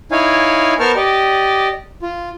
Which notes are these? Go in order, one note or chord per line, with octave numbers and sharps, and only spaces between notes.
D#4 E4 C#5 F5 G#5
B3 A#4 C5 A5 C#6 F6
G4 D5 D#5
F4